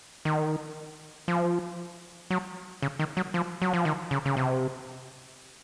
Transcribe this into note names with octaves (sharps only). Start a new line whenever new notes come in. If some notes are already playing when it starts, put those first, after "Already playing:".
D#3
F3
F#3
C#3
D#3
F#3
F3
F#3
F3
D#3
C#3
C#3
C3